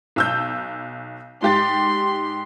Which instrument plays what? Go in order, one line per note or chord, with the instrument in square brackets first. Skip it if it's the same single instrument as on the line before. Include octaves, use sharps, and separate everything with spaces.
[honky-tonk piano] B1 E6 G6
[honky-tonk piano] G#2 G4 A6 [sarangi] C6